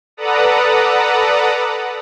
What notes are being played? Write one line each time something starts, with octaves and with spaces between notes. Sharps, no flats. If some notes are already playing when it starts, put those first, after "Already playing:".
A4 B4 D5 F#5 A#5 D#6